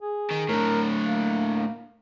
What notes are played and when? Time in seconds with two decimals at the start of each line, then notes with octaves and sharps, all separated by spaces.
0.01 G#4
0.31 D#3
0.49 A2 D3 A#4
1.02 A#3